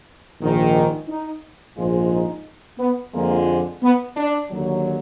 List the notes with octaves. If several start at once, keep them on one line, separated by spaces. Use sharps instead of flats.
A#1 G#2 D#3 G#3
D4
D#4
A#1 G#2 F3 G#3 F4
D#4
B3
F2 D3 F3 G#3 A#3
B3
D4
D#2 D3 F#3